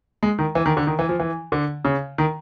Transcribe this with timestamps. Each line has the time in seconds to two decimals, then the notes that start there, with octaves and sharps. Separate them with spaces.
0.23 G#3
0.39 D#3
0.55 E3
0.66 D#3
0.77 D3
0.87 D#3
0.99 E3
1.09 F3
1.20 E3
1.52 D3
1.85 C#3
2.18 D#3